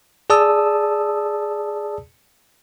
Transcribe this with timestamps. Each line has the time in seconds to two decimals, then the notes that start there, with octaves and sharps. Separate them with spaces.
0.30 G#4 D5 A5 D#6 E6